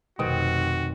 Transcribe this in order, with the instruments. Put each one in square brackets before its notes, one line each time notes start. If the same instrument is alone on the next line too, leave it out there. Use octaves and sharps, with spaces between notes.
[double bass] F1 [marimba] B2 [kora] D#3 C4 [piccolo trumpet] F#4